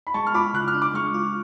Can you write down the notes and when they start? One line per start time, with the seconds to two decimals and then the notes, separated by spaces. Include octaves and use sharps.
0.07 B5
0.14 G#3 A5 C#6
0.27 F6
0.34 F4 B5 D6
0.54 C#3 F#6
0.68 F6
0.74 D4
0.82 D6
0.94 G#3 C#6 F6
1.14 F4